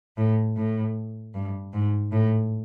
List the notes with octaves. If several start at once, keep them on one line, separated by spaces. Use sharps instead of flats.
A2
A2
G2
G#2
A2